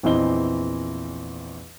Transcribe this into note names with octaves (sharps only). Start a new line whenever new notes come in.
A#1 E2 E3 C4 D#5 G7